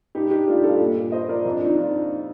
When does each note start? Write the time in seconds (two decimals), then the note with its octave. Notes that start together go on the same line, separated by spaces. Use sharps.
0.15 G2 D#4 G4
0.31 G2 D#4 G4
0.48 A3 D4 F4
0.64 G2 F4 A4
0.81 A#2
0.97 A#3
1.12 A#3 C5 D#5
1.29 F3 A#4 D5
1.45 F2
1.52 D4
1.61 F3 D#4
1.78 F3 D4 F4